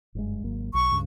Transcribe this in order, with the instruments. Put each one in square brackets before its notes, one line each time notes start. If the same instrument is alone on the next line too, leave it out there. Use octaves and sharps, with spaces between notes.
[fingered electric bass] F#1 G2 G#3
G#1 F#3 A#3
[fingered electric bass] B1 [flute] C#6
[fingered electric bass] C#2 G2 C#3